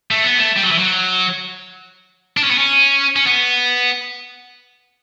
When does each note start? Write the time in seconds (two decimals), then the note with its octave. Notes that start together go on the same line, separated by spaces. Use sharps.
0.11 A3
0.24 B3
0.38 A3
0.56 G3
0.63 F#3
0.71 E3
0.78 F#3
2.37 D4
2.44 C#4
2.51 B3
2.58 C#4
3.16 C#4
3.27 B3